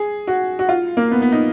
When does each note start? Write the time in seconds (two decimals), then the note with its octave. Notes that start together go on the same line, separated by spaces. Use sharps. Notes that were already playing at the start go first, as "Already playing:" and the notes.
Already playing: G#4
0.27 F#4
0.59 F#4
0.69 F4
0.97 A#3
1.11 B3
1.22 B3
1.32 D#4